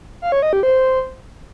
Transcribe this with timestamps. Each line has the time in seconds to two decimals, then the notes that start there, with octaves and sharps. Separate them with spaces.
0.22 F5
0.32 C#5
0.42 D#5
0.53 G4
0.63 C5